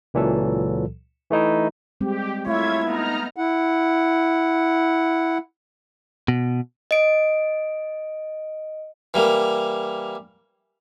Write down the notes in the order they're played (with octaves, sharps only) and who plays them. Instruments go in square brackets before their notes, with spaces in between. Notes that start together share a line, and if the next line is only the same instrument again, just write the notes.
[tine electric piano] C#2 A#2 E3 F#3 A4
E3 A3 D#4 E4
[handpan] G3 G#3 C4 [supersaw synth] G4
[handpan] A3 [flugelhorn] E4 [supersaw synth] F4 E5 G#6 [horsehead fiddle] C#5
[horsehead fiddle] B3 [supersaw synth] D#4 A#5 F6
[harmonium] E4 F#5
[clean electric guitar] B2
[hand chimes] D#5 D7
[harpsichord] E3 G3 A#3